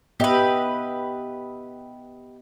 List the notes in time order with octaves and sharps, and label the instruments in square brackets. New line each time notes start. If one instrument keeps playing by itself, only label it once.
[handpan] B3 D#5 E5 [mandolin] G4 B4